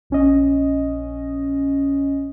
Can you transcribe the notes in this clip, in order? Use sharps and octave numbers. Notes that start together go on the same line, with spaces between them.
A#1 C#4 D#5